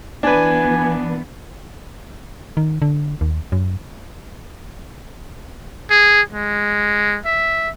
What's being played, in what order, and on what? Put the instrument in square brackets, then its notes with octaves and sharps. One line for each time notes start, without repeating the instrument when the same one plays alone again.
[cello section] E3 B3 [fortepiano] D4 B4 [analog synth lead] G#5
[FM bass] D#3
D3
D#2
F#2
[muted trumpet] G#4
G#3
E5